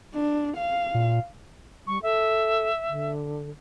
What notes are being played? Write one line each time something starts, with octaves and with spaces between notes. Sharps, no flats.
D4
F5
A#2
G3 C#6
A4 E5
D3